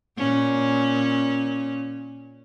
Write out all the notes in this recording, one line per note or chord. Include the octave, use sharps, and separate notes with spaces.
A#2 C#4